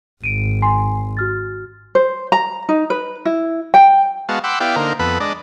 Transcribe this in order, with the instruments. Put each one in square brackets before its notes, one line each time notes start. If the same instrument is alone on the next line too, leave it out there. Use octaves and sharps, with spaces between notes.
[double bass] G#1 [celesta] D7 D#7
[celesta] G#5 C6 C7
F#4 F6 A6
[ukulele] C5
A#5
D#4
B4
E4
G5
[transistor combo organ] G#3 B3 F#4 F5 A5
F#5 G5 B5 C6 D6 E6
B3 E4 G4 D5 F5 G5
D3 A#3 D#4 A#4 C5
F2 B3 A4 B4 B5
G#3 D4 D5 D#5